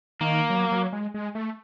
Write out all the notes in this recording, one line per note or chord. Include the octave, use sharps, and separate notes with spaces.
D#3 A#3
F#3
F#3
G#3
G#3
A3